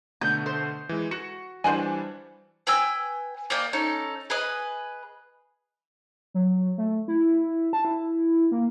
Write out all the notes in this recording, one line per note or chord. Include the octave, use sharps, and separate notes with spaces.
B2 D3 A3 G6
C5
E3 G#3
F#4 C#7
E3 G3 D4 C5 F#5 G#5
B4 G5 G#5 E6
A#3 D5 D#5 G5
C#4 D#4 A4
G#4 B4 D#5
F#3
A3
E4
A5
E4
A#3